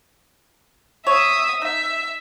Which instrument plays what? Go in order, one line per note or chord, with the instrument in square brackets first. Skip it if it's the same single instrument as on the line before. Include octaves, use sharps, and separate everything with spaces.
[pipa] C#5 [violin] E5 D#6
[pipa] D#4 [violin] E5